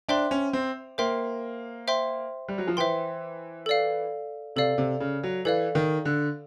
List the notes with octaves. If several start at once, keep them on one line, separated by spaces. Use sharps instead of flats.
D4 C5 E5 G5 C6
C#4
C4
A#3 C5 E5 G5 C6
C5 E5 G5 C6
G3
F#3
F3
E3 C5 E5 G5 C6
A4 D5 F5
C3 A4 D5 F5
C3
C#3
F#3
E3 A4 D5 F5
D#3
D3